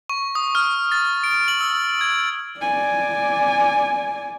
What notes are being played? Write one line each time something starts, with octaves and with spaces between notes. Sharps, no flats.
C#6
D#6
F6
A6
D7
F#7
E6
G#6
D5 G#5